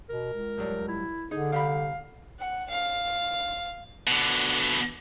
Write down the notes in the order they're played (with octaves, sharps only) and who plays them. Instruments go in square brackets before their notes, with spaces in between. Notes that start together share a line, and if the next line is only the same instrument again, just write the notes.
[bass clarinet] B2 [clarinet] A#4
[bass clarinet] C#2
[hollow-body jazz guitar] A2 F#3 G3
[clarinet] E4
[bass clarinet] D3 [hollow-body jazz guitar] D#4 [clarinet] G#4
[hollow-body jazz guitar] C2 G4 B5 [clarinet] F5
[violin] F#5
F5
[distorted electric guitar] B2 D3